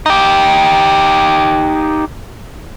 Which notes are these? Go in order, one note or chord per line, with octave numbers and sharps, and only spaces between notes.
D#4 G4